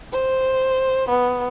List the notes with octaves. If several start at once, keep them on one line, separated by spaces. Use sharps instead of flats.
C5
B3